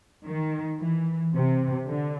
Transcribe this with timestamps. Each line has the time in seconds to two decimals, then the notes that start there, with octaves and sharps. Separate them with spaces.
0.25 D#3
0.79 E3
1.33 C3
1.86 D3